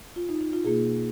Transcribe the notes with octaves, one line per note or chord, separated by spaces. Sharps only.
F4
D#4
D#4
F4
B2 A#3 F4 G#4